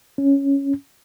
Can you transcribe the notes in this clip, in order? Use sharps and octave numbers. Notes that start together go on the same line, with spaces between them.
C#4